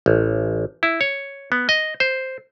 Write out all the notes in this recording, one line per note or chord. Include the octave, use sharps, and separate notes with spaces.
A1
E4
C#5
B3
D#5
C5